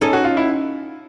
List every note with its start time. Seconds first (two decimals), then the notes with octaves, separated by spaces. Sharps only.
0.01 C#4 D#4 A4
0.13 F#4
0.24 F4
0.37 E4